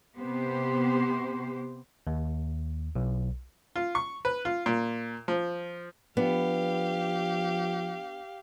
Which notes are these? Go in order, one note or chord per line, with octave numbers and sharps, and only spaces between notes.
C3 B3 G4 C5
D#2
B1
F4
C#6
B4
F4
A#2
F3
F3 B3 D4 G4 F5